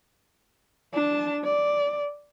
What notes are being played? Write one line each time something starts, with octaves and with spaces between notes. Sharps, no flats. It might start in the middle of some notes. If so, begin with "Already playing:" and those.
D4 A5
D5